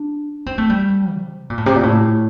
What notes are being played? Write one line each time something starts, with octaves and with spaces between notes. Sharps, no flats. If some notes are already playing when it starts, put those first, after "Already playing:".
Already playing: D4
C4
A3
G3
C3
A#2
A2
C3
A#2
A2